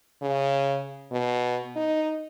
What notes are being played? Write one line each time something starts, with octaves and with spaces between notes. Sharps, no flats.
C#3
B2
D#4